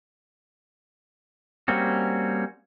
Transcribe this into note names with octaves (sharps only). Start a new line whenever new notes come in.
G3 A#3 C4 C#4 F#4